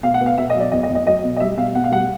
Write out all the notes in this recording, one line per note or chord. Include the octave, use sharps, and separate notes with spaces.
B2 F5
F#5
B3 F5
B2 E5
D#5
F#3
D5
E2 D#5
D#5
E2
D#5
F#3 D#5
B2
D#5
G3 E5
B2 F5
B2 F#5
F5
G3 F#5